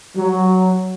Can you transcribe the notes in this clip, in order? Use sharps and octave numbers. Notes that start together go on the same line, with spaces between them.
F#3